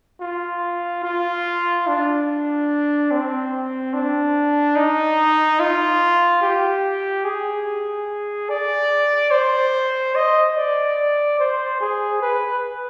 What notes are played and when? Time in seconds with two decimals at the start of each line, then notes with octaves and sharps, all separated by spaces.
0.21 F4
1.04 F4
1.87 D4
3.11 C4
3.94 D4
4.76 D#4
5.60 F4
6.42 G4
7.25 G#4
8.49 D5
9.31 C5
10.15 D#5
10.56 D5
11.39 C5
11.81 G#4
12.22 B4